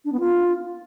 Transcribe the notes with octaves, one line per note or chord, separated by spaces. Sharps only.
D4
B3
F4